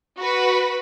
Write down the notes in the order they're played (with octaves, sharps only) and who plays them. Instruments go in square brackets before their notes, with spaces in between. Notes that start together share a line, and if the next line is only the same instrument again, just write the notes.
[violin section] F#4 B4 B5